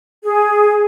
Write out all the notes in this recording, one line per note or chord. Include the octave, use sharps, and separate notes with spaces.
G#4